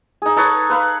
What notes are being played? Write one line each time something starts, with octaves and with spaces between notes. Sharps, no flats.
D#4 G#4
D#4 A4 B4 C#5
B4 F5 B5